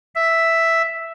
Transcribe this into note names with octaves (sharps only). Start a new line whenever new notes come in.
E5